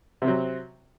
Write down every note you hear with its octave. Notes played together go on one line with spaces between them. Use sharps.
C3 F#3 C4